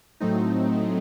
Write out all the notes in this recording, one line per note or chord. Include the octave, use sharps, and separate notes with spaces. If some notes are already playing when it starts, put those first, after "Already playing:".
A2 F#3 A3 C4 D#4